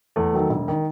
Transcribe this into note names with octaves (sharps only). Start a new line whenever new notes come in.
E2 A3
D#3 F#3
E1
D#3